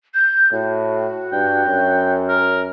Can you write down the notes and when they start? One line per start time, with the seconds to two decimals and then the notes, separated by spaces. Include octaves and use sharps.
0.14 G6
0.52 A2 F#4
1.32 G2 G5
1.66 F#2
2.28 A#4